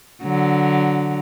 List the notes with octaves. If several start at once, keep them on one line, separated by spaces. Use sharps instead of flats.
D3 F#3